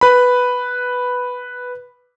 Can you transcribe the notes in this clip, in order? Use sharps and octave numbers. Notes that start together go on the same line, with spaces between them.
B4 B5